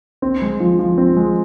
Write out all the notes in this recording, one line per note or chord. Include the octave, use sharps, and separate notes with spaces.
C4
G#3
F3
F3
C4
G#3